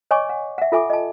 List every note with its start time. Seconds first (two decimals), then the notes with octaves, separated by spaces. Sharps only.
0.11 C#5 D#5 G#5 C#6 D6
0.29 F#5
0.58 E5 F#5
0.72 F4 A4 E5 G#5 D6
0.90 D#5 A5